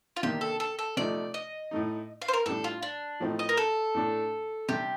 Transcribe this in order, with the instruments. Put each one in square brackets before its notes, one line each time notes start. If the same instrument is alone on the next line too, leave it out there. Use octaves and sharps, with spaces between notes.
[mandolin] F4
[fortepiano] C3 D#3 A#3 D4 [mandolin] G4
[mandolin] A4
A4
A4
[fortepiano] C3 F3 A3 D#4 [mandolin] D5
[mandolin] D#5
[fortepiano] A2 A3 D#4
[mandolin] F5
C5
A#4
[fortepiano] A2 G3 D4 [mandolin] A4
[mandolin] F4
D4
[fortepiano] A2 F3 A3 C4 D#4
[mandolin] D#5
A#4
A4
[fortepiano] A2 A3 D4
[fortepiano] C3 G3 D4 [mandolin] G4